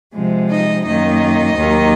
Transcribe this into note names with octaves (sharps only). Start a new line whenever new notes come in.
C3 F3 G#3
D#4 D#5
F#2 D#3 A#3 D#4 D#5
D#2 D#3 F#3 A#3